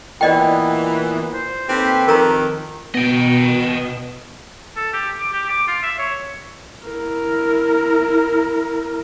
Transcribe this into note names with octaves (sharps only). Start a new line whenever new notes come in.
A#2 E3 B3 D5 D#5 G5
C5
D#2 C4 G4 A4 B4
F2 D#3 A#4 A#5
B2 B3 D#5 G5
A4
G4
D6
G4
D6
F4
E5
C#5
E4 A#4